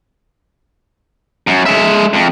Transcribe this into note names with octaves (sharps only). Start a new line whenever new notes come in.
F#2
G#3 E5
F2